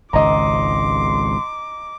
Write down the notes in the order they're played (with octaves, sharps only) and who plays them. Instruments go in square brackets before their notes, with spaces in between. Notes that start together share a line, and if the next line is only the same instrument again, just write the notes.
[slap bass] G#1 C#2 [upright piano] D#5 A#5 [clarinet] C6 [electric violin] D6